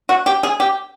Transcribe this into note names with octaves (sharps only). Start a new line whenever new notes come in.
F#4
G4
G#4
G4